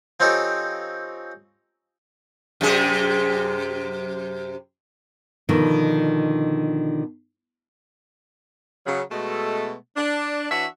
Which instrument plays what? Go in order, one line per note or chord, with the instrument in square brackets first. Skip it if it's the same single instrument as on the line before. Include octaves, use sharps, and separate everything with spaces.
[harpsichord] F3 C4 C#4 D#4 G4 A4
[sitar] F#2 C3 G#4
[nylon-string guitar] B2 D3 D#3 F3
[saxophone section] C#3 F#3
B2 G#3 A3
D4
E3 D4 E4 F#4 C#5 E5